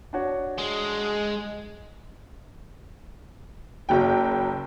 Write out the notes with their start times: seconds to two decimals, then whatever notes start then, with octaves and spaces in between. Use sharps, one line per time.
0.13 D4 F#4 C#5
0.58 G#3
3.89 F#1 F#3 G5